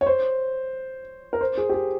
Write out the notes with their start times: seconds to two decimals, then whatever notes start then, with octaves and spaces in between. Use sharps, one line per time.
0.01 C#5
0.06 C5
1.33 A#4
1.41 C5
1.57 G#4
1.69 G4
1.74 G#4